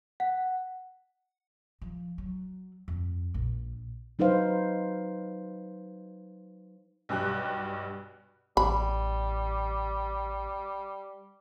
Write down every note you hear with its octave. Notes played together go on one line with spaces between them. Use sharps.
F#5
F3
F#3
F2
A#1
F#3 D#4 B4 C5 F5
B1 G2 G4 F#6
A1 G3 B5